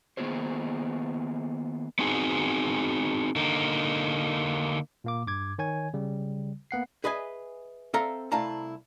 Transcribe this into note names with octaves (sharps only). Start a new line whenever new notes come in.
D#3 A#3 B3 F4 G#4 C5
B3 C4 D#4 F#4 G#4
D3 A#3 D#4
A#2 A#3 D6
G2 D6 G#6
D#3 C#5 G#5 G#6
C#3 G3
A#3 B3 F#5 C7
G#4 B4 D#5 E5 G#5
C4 A4 E5 F5 A#5
C2 A3 E4 F5 A5 A#5